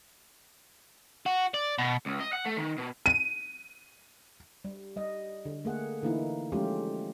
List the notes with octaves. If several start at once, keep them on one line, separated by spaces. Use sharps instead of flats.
F#4
D5
B2
C#2
D#5
F#5
A3
D#3
B2
D#7
G3
G3 D#5
D3
A3 A#3 G#4 F#5
D3 E3 A#3 D#4 E4
F3 G#3 A3 C#4 F4 G4